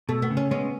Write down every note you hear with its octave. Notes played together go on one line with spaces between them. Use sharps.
B2 A3
B3
C#3
C#4
G#3 B3 C#4